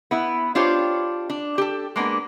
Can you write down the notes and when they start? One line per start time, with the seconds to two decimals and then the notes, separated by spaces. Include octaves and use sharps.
0.11 B3 E4 B4
0.55 D4 F4 G4 C5 C#5
1.30 D4
1.58 G4 A4
1.96 G#3 A#3 B3 D4